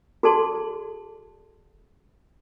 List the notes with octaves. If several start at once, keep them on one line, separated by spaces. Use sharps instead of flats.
F#4 G#4 A4 D5 A5 C6